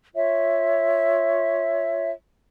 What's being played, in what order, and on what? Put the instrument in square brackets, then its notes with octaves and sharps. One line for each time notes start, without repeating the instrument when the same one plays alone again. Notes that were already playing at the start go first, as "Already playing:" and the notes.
[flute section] F4 C#5 E5